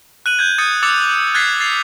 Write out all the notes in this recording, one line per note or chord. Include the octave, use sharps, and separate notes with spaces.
F#6 D#7 F#7
G6 G#6
D#6 G#6 A6 C#7 D#7
D6 E6 A6 C#7 F7
F6 F#6 G#6 A6 B6 C7
A6 C7 F7